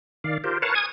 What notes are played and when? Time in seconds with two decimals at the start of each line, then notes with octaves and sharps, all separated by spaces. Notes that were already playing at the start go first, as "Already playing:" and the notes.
0.24 D#3 D5 F5
0.44 F4 G4 A#4 C5
0.62 A#4 B4 C#5 F5 F#5 A5
0.75 G#5 D#6 G#6